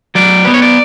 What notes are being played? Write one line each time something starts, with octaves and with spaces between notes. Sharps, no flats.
F#3 D5
B3 B4
C#5
D5